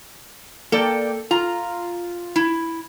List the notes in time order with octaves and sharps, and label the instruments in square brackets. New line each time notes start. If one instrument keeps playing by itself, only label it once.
[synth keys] A#3 D5 G5 [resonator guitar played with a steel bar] A4
[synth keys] F4 [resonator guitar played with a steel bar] A#5
[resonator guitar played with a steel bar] E4